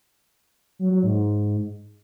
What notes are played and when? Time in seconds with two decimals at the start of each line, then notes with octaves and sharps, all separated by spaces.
0.79 F#3
0.91 F#3
1.03 G#2